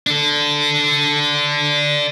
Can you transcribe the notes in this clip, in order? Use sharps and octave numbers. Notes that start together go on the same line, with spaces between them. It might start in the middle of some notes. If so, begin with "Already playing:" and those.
D4 A4